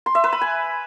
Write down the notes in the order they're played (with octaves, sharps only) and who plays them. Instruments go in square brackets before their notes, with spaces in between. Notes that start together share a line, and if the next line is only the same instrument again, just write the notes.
[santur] C6
E5
B4
B5
G#5